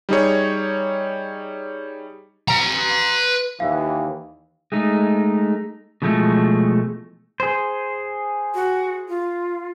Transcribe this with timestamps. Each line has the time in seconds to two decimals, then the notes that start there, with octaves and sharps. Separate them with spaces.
0.09 G3 D#4 G#4 C#5
2.48 B4 A#5
3.60 D#2 E3 F5
4.72 G#3 A3 D#4
6.02 B2 E3 F3 G#3 A3
7.40 G#4 C5
8.55 F#4
9.09 F4